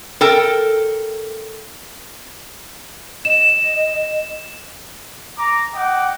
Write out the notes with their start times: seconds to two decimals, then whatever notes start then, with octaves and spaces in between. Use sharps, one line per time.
0.21 A4 A#4 G5
3.25 D#5 E7
5.38 A#5 D6
5.75 D#5 F#5 G5 D6